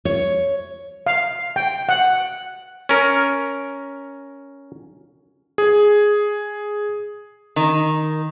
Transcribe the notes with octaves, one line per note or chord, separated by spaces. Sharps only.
C#5
F5
G5
F#5
C#4 A#4
G#4
D#3